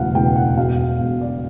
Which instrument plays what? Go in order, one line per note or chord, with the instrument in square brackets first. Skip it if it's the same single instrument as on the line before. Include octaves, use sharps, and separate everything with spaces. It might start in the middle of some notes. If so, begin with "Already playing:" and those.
Already playing: [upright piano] E1 D2 C#3 E3 F5 F#5
E1 D2 C#3 E3 G5
F#5
E1 E2 B2 F5
E1 E2 B2
D5